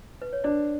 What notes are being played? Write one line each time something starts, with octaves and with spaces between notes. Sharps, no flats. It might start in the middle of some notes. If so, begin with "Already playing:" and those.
B4
C#5
D4 D5